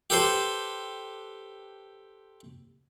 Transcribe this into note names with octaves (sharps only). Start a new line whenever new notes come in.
G4 A4 B4 C5